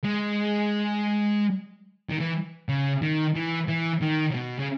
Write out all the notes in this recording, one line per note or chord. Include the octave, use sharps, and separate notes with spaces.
G#3
D#3
E3
C#3
D#3
E3
E3
D#3
C#3
B2
C#3